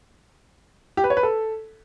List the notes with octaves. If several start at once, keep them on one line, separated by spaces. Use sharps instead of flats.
G4
B4
C#5
B4
A4